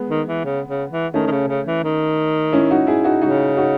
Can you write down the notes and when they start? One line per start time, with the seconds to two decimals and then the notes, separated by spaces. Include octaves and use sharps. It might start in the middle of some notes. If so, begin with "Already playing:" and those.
Already playing: G#3 B3
0.10 D#3
0.28 E3
0.44 C#3
0.68 C#3
0.91 E3
1.14 D#3 A3 C#4
1.27 D#3
1.31 C#3
1.48 C#3
1.67 E3
1.84 D#3
2.52 C#4 E4
2.71 D#4 F#4
2.87 E4 G#4
3.04 D#4 F#4
3.22 C#3 D#4 F#4
3.57 D#4 F#4